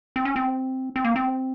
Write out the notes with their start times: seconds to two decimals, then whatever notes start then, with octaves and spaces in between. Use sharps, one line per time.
0.16 C4
0.25 C#4
0.36 C4
0.96 C4
1.05 A#3
1.16 C4